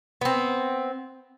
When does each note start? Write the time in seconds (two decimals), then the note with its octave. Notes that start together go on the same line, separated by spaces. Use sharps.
0.21 B3 C4